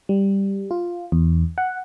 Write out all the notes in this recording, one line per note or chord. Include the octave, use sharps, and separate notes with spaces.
G3
F4
E2
F#5